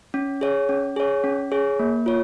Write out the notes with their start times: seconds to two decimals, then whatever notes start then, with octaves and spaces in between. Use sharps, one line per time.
0.14 C#4
0.41 G#4 C#5
0.69 C#4
0.96 G#4 C#5
1.24 C#4
1.52 G#4 C#5
1.79 A#3
2.06 F4 C#5